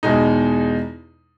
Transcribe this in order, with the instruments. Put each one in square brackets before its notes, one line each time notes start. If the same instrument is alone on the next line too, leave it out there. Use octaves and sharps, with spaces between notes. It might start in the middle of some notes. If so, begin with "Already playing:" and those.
[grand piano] E2 B2 G#3 D#4